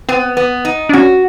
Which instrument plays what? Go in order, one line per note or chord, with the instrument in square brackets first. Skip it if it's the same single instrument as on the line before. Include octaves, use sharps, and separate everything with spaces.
[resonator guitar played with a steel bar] B3 [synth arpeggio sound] C4
[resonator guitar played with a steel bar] B3
D#4
[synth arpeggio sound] D4
[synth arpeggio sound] C#4 [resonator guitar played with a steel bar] F#4